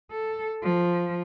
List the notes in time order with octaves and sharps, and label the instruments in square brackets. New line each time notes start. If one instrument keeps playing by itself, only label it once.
[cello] A4
F3